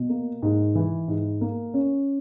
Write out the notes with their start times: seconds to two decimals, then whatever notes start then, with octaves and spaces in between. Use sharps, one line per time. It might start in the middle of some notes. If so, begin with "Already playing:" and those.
Already playing: B2
0.09 A#3
0.42 G#2
0.75 E3
1.08 G#2
1.41 A#3
1.74 C#4